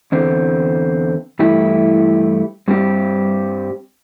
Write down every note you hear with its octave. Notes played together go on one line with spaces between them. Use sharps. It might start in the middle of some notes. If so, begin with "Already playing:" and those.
E2 D3 C4
G2 E3 A3 E4 G4
G2 G3 C4 G4